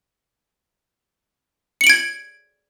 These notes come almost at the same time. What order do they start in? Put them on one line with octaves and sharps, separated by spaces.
C#7 F#7 D7 G#6